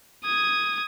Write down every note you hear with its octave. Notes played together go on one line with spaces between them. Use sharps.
D#6 G#6